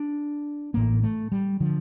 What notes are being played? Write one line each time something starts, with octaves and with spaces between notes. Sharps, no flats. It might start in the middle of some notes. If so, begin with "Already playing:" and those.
Already playing: D4
A1 A2 A#3
A3
G3
D3 F3